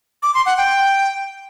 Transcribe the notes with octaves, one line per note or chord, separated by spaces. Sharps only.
D6
C6
F#5
G5